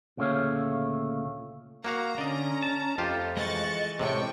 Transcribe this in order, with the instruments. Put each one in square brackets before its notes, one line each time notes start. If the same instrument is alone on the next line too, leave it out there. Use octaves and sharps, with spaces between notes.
[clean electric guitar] D2 A#2 C#3 A3 C#5 F5
[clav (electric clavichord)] A#3 F#4 F5 [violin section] A#5
[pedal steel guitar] D3 [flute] C#4 [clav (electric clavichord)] D5 D#5
[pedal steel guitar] A5
[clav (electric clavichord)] F2 F4 G4 [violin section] A3 [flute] D#5
[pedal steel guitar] E3 G#3 [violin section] C#6 F#6 A6
[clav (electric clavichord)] A2 C3 [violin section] G5 C#6